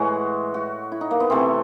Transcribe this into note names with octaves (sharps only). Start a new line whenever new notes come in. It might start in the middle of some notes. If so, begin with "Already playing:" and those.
Already playing: A2 E3 G#3 F#4
F#4
E4
D#4
A#3
B3
C3 E3 A3 C4